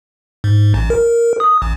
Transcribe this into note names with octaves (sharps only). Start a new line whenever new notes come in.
G#2
A1
A#4
D#6
A1